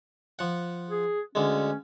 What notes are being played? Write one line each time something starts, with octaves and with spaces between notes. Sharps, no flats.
F3 F#5
G#4
D2 D3 G#3 C#4